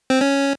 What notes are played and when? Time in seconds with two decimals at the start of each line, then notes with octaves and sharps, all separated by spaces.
0.10 C4
0.21 C#4